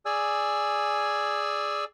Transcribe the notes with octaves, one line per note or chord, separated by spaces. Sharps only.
G#4 D5 G#5 E6